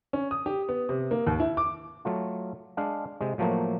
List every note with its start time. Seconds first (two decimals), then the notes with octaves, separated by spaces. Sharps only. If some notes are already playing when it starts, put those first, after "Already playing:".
0.13 C#4
0.31 D#6
0.46 G4
0.69 B3
0.89 C3
1.11 A#3
1.27 D#2
1.40 E4
1.57 D6
2.05 F#3 A3 F4
2.77 G#3 D4 F5
3.21 C3 G#3
3.38 A2 F3 F#3 A3 A#3